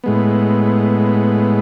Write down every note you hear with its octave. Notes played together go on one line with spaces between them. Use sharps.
A2 G#3 B3